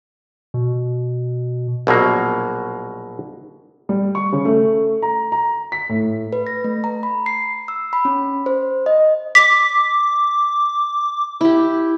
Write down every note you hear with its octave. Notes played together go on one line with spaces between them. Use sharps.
B2
A#1 B2 F#3 A#3
G3
C#6
C#3
A3
A#5
A#5
B6
A2
B4
A#6
A3
A#5
B5
C7
E6
B5
C#4
C5
D#5
D6 B6
E4 G4